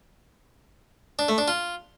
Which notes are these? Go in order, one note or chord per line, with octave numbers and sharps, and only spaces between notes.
D4
A3
D4
F4